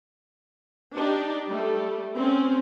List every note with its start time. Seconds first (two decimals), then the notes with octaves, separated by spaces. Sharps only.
0.95 D4 D#4 G4
1.50 G3 A3
2.16 C4 C#4